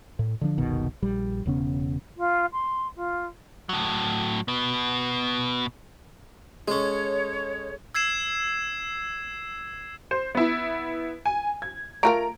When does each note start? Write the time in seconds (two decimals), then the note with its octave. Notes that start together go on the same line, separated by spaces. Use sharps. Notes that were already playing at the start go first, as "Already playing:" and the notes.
0.19 A2
0.41 D3 F3 D4
0.58 F#1 C2 B2 D#3
1.02 A#1 G3
1.46 E1 C#3 B3 C#4
2.17 F4
2.52 C6
2.96 F4
3.69 A2 F#3
4.48 B2 B3
6.68 G#3 C#4 G#4 A4 C#5
7.95 E6 G#6 C7 E7
10.11 C5
10.35 B3 E4
11.26 G#5
11.62 G#6
12.03 A3 F4 A#4 A#5 D7